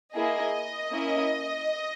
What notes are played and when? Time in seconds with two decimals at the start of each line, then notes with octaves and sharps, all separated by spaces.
0.15 A#3 E4 G#4 D#5
0.92 A#3 C#4 E4